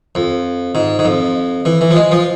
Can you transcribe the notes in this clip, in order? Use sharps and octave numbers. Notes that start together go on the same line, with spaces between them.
F2
G#2
G#2
F2
E3
E3
F3
G#3
F3